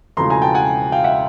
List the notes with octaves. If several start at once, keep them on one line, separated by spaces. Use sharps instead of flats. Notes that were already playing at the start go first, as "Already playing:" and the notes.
E1 E2 C#3 F3 A3 A#5 C6
G#5 A#5
G5 A5
F#5 G#5
F5 G5
E5 F#5